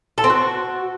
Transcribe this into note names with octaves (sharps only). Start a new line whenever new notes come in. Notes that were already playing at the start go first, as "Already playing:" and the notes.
A4
C4
F#4